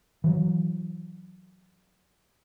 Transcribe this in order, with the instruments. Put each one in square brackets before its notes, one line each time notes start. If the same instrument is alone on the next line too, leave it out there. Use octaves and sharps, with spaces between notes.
[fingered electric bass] E3 F#3